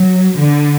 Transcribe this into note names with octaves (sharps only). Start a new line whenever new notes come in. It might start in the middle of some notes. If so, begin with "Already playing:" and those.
Already playing: F#3
D3